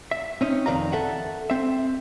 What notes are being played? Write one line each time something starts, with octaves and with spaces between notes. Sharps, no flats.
E5
C4 C#4 D#4
F2 D#3 B4 D5 F5 A#5
A4 E5 F#5
C4 E5